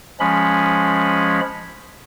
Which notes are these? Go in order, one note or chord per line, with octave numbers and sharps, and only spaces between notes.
F3 G#3 C#4 B5